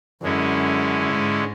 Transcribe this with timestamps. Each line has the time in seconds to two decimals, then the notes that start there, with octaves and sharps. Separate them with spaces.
0.22 F#2 D3 G#3 C#4 E4
1.13 G#2